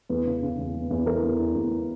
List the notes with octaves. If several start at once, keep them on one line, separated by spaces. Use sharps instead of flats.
E2 B4
C#3
C#3
E2
E2
E2
E3 A#4
E2
E2
E2